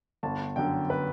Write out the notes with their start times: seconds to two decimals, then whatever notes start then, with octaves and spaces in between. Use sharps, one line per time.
0.23 G1 A5
0.56 F#2 D3 G5
0.90 B4